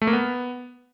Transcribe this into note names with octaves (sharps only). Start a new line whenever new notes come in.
A3
A#3
B3